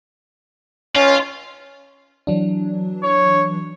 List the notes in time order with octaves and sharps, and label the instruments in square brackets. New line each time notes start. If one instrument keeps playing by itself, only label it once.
[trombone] C#4 [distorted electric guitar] F4
[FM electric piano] E3 F#3 D4
[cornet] C#5